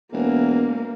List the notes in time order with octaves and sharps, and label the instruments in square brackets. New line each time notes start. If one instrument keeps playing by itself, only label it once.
[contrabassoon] E1 [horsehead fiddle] A#3